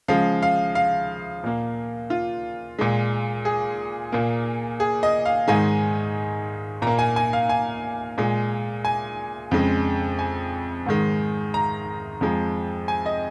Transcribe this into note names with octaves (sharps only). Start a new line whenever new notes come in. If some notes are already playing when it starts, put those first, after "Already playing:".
C#3 F3 G#3 F5
F5
F5
A#2 A#3
F4
A#2 G#3
G#4
A#2 A#3
G#4
D#5
F5
G#2 D#3 G#3 G#5
A#2 A#3 A#5
G#5
G#5
F5
G#5
A#2 G#3
G#5
F2 C#3 G#3
G#5
G#2 D#3 G#3
A#5
F2 F3 G#3
G#5
D#5